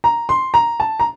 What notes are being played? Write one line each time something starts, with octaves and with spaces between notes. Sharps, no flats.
A#5
C6
A#5
A5
A#5